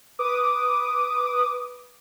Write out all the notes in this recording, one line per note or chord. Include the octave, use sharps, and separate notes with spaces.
B4 D6 D#6